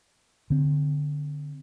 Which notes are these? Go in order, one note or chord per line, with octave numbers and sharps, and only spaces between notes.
D3 C4